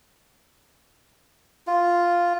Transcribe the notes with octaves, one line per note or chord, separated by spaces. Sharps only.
F4